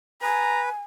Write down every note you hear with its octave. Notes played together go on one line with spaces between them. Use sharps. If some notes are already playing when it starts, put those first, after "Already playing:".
B4 G#5 A#5